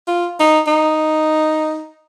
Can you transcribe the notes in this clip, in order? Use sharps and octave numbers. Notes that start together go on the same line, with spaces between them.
F4
D#4
D#4